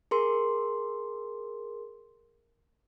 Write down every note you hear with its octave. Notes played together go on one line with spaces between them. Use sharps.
G#4 A#4 C6